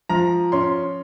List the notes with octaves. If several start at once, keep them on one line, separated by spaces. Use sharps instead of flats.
F3 A#5
C#4 C6